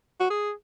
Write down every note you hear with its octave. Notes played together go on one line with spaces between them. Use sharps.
F#4
G#4